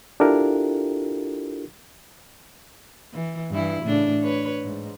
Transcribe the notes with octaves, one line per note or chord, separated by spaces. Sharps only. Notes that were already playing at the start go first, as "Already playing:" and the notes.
D4 E4 F4 G4 A4 A#4
E3
G2 E3 E4
A2 C#3 D4
B4 C#5
G#2